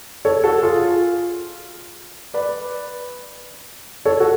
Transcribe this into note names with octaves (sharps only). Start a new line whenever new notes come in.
A4 C#5
F#4 A4
F4 G#4
B4 D5
A4 C#5
F#4 A4